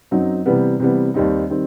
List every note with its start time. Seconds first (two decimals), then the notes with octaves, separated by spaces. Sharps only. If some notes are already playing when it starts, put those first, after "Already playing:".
0.11 F#2 F#3 C4 D#4
0.46 C3 E3 G3 B3
0.80 C3 E3 G3 B3
1.14 D#2 D#3 G3 C4 D#4
1.50 D#3 G3 C4